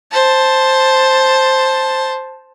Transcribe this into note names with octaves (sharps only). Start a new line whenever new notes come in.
C5 A5